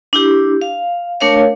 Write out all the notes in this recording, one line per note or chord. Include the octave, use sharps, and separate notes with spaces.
D4 E4 G4
F5
A3 D4 A#4 C#5 F5